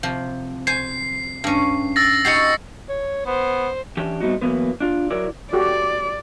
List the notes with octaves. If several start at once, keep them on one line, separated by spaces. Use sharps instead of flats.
C3 F3
C5 G#5 C7
G2 C#4
E6 A6 A#6
D#4 F#4 G4 C7 C#7
C#5
B3 C5
E3 C#4 D4 G4
G3 A3 B3 C4 D#4 F#4
E3 F#3 A#3 B3 B4
D4 F4
F#3 E4 A#4 D5
F#4 G4 A4 D5